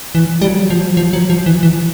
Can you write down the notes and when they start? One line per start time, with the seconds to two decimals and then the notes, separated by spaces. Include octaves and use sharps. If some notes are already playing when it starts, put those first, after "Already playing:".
0.15 E3
0.42 G3
0.48 F#3
0.70 F3
0.80 F#3
0.97 F3
1.13 F#3
1.30 F3
1.46 E3
1.63 E3